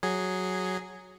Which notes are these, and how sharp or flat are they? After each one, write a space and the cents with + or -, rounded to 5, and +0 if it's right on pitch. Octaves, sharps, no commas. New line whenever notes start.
F#3 +0 G#4 +0